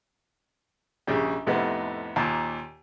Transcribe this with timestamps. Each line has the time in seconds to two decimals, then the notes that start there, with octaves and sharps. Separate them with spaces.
1.07 A#1 C#3 G3
1.47 F2 A2 C3 A3 B3 D#4
2.16 D#2 A#2 A5